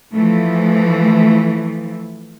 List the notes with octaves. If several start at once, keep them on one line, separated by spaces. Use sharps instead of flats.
E3 F3 A3